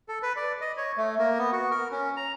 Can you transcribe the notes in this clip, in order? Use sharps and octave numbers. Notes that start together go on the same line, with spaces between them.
A4
B4
D5
D#5
C#5
A3
A#3
B3
F#4
A#4
C#4
A#5